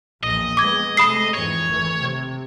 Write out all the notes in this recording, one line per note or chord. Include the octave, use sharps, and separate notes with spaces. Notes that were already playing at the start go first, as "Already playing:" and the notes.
A#1 E2 A#2 D#5
G#3 B3 D6 G#6
C3 G#3 A3 B5 D#6 C7
F2 G#2 E3 C#5
G#1 E3 A3
C3